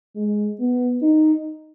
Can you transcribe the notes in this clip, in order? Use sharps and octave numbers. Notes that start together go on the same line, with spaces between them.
G#3
B3
D#4